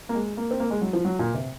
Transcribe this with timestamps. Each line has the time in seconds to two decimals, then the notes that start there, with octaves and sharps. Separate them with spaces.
0.09 A#3
0.15 G#3
0.37 A#3
0.51 C4
0.60 A#3
0.70 G#3
0.81 F#3
0.93 F3
1.05 F#3
1.19 A#2
1.34 C3